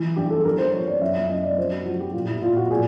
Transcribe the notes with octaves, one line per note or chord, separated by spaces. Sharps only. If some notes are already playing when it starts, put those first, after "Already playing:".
Already playing: E3
G2 G4
A4
G2 A#4
C5
F3 C#5
D5
F#2 E5
E5
F#2 D#5
D5
F3 C5
F#4
F3 F#4
G4
A#2 F4
E4
A#2 F4
F#4
A#2 G#4